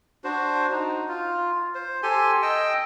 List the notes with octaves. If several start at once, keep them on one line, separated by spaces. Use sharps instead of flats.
D4 F#4 C5
D#4
F4
C5
G4 A4 G#5 C6
D#5 G5 E6